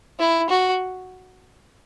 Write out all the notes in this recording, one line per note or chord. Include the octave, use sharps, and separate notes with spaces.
E4
F#4